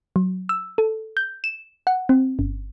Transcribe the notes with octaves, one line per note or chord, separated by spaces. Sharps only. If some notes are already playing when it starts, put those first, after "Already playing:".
F#3
E6
A4
G6
E7
F#5
C4
G1